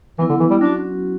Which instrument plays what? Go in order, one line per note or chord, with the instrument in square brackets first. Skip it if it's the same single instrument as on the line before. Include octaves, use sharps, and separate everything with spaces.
[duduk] E3 [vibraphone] F#3 B3 E4
[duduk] D3
E3
G3
[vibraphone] F#3 C#4 F#4 [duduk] D4